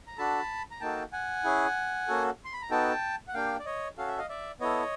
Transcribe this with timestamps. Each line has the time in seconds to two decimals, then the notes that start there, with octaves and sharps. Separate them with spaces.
0.07 A#5
0.18 D4 F#4 A4 A5 B5
0.71 A#5
0.81 A#3 D#4 F#4 A4 G5 A5
1.13 F#5 G#5
1.44 C#4 E4 G#4
2.08 A#3 C#4 F#4 A4
2.45 C6
2.53 B5
2.62 A#5
2.71 B3 D#4 F#4 A4 G5 A5
3.28 F#5
3.34 A#3 D4 G4 F5 G5
3.59 D5
3.65 C#5 D#5
3.98 C#4 F#4 A4 F5
4.08 E5
4.18 D#5 F5
4.29 D5 E5
4.60 B3 E4 A4 C#5 D#5